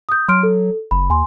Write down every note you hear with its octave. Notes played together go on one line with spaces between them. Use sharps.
D#6 G6
F#3 C6 F6 D7
A4
F#1 B5
D#2 G#5 C6